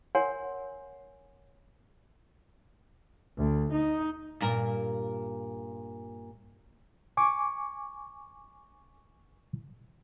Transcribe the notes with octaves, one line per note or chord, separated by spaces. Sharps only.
A#4 C#5 F#5 G#5 C6
D2
D#4
G2 A#2 A#4
G#5 C#6 D6